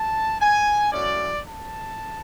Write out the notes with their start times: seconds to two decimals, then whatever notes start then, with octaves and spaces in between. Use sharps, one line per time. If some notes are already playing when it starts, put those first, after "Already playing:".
Already playing: A5
0.40 G#5
0.92 F#3 A3 C#4 E4 D5
1.45 A5